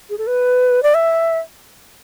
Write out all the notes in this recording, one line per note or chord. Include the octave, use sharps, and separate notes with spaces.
G#4
A4
B4
D5
E5